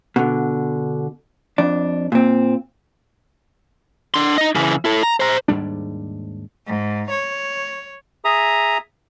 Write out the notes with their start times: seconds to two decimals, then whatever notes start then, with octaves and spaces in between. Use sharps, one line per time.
0.16 B2 D3
1.58 F2 D4
2.12 A#2 C4
4.14 D4 C6
4.38 D#4 D#5
4.55 C#3 E3
4.85 E4 A4
5.03 A#5
5.20 C5 A#5
5.48 D#2 G#2 G3 D4
6.67 G#2
7.09 C#5
8.25 G#4 E5 A#5 D#6